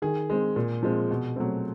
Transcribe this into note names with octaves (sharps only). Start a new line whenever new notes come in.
D#3 G#4
G#3 C4
A#2
F3 G#3 C4
B2
F#3 A3 C4